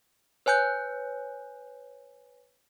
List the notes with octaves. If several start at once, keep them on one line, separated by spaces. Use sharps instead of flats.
B4 C#5 G#5 F#6 G6